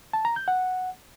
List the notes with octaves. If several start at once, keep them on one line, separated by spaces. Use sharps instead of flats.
A5
A#5
G6
F#5